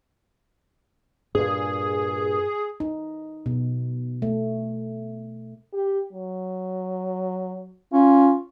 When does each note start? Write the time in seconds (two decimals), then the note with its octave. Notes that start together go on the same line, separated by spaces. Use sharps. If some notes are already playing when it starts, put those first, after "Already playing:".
1.35 G2 A#2 G#4
2.80 D#4
3.46 B2
4.22 A3
5.74 G4
6.13 F#3
7.93 C#4 F4